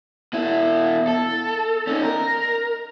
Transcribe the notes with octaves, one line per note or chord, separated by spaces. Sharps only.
B2 E4
A4
C#4 D#4
A#4